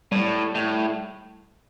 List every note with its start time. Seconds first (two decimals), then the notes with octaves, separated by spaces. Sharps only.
0.12 A2 G3
0.55 A2